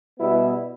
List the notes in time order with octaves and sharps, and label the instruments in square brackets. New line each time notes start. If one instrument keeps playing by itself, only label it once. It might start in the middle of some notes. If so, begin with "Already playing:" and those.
[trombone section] B2 G3 B3 E4